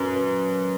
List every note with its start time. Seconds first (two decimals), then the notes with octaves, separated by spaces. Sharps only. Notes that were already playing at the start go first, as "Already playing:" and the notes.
Already playing: F#2 C#4 B4
0.16 B4